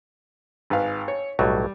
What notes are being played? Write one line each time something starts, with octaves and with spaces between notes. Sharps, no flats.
G#1 B4 F5
C#5
B1 A2 F#3 G3